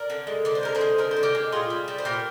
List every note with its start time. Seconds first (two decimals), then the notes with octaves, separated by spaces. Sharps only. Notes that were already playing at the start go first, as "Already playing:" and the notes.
Already playing: A#4 D5
0.10 D3
0.27 G#3
0.45 D3 D5
0.55 C5
0.63 G#3 A#4
0.75 G#4 C5
0.81 G#3
0.98 D3 A#4
1.11 C5
1.16 D3
1.23 G4 A#4
1.35 G#3
1.52 A#2 F4 G#4
1.70 G3
1.88 G3
1.98 C5
2.05 A#2 G4 A#4